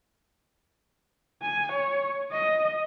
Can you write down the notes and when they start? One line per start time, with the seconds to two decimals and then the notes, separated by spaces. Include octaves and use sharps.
1.42 G#5
1.73 C#5
2.32 D#5